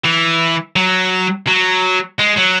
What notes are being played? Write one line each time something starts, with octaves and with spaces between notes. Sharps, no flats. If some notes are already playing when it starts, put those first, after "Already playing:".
E3
F#3
F#3
G#3
F#3